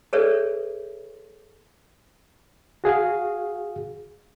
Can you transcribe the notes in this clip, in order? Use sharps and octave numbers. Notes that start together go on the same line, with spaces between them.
G#4 A4 B4 C#5 D5 E5
F#4 G#4 F5